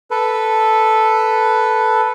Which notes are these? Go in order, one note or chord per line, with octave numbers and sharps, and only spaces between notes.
A4 B4